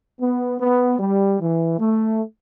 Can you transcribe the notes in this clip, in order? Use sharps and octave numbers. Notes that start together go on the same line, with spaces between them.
B3
B3
G3
E3
A3